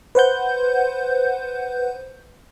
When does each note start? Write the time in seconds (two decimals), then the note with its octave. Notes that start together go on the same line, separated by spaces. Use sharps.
0.15 B4 C5 F#5 G6